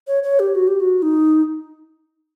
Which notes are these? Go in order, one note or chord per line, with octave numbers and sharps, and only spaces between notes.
C#5
C#5
G4
F#4
G4
F#4
D#4